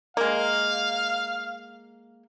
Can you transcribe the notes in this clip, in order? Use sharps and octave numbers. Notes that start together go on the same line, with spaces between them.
G#3 A#3 F5